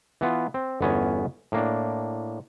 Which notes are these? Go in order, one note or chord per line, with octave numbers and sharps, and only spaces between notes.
E3 B3 F4
C4
G1 E2 B3 C#4 G#5 A#5
A2 A#3 D4